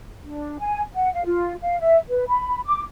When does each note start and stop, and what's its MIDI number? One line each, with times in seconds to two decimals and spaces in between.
0.25 0.57 62
0.59 0.80 80
0.93 1.10 78
1.13 1.24 77
1.25 1.54 65
1.62 1.78 77
1.80 1.98 76
2.09 2.24 71
2.28 2.60 83
2.65 2.81 86